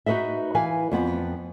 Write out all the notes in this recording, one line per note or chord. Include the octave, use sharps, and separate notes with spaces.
D#4 F#4 B4 D#5 E5
E3 B4 F5 G#5
F2 B3 F#5